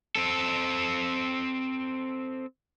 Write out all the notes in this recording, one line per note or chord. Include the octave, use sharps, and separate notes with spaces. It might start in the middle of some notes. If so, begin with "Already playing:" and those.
C4 A4